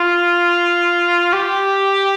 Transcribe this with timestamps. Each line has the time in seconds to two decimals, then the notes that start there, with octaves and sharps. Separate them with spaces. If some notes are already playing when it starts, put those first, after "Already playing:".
Already playing: F4
1.33 G4